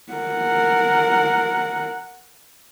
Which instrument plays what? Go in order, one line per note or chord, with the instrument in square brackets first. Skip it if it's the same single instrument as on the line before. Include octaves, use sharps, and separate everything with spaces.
[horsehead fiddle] A#4 F#5